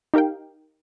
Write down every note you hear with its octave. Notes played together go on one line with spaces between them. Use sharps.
D#4 G4 A#4 F5 G5